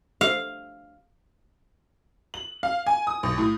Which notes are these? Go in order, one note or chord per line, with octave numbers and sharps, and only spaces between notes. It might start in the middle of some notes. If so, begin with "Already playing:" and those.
F5
F#7
F5
G#5
D#6
B1
A2